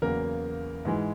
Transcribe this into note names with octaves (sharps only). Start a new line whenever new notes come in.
E2 C#3 F#3 A#3 A#4
G#2 E3 G#3